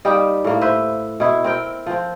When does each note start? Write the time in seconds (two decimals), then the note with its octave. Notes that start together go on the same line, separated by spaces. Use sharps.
0.05 G3 A#3 D#4 G4
0.44 A2 A#3
0.61 B4 C5 E5
1.20 B2 E4
1.44 C4 A#4 G5
1.86 F3 C4